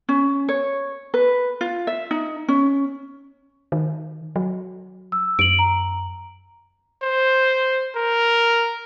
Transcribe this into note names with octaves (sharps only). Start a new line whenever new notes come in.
C#4
C#5
B4
F4
E5
D#4
C#4
D#3
F#3
E6
F#2 D7 F#7
A#5
C5
A#4